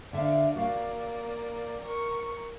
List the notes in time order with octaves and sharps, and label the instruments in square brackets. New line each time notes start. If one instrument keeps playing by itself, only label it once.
[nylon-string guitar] D3 E5 [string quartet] D5 F5
[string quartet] A#3 D5 [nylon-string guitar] F#4 F5
[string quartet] A#4 C#6